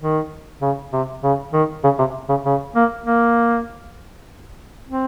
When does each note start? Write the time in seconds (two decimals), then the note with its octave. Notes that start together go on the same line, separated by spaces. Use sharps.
0.01 D#3
0.62 C#3
0.92 C3
1.23 C#3
1.53 D#3
1.84 C#3
1.99 C3
2.29 C#3
2.46 C#3
2.75 A#3
3.06 A#3
4.89 C4